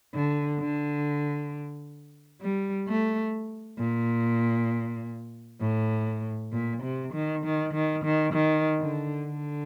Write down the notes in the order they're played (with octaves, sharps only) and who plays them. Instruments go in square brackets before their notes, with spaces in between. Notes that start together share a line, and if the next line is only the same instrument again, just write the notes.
[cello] D3
D3
G3
A3
A#2
A2
A#2
C3
D#3
D#3
D#3
D#3
D#3
D3
D3